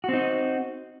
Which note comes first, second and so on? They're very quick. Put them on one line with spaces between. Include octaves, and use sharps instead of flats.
F#4 C4 D#4